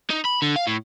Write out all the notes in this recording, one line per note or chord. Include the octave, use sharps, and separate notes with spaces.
D#4
B5
D3
F5
A2